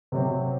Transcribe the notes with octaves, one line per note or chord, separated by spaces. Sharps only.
C3 F#3 C4